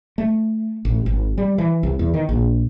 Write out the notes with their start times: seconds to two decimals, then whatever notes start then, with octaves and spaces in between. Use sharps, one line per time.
0.18 A3
0.85 A1
1.06 G#1
1.38 G3
1.58 E3
1.83 C2
1.99 E2
2.14 D#3
2.29 A#1